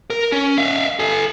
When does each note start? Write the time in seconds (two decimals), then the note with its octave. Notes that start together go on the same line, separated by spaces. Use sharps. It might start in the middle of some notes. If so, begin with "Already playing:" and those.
0.10 A#4
0.32 C#4
0.58 E5 F5
0.99 A4 G#5